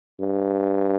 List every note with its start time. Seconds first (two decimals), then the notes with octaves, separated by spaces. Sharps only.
0.20 G2